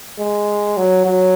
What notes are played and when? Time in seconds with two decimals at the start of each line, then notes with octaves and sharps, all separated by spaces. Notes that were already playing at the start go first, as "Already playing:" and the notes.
0.19 G#3
0.77 F#3
1.06 F#3